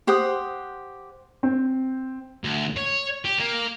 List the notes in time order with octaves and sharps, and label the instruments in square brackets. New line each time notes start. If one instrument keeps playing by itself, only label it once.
[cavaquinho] G4 C5 F#5 D#6
[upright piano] C4
[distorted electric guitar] D2
C#5
G4
A#3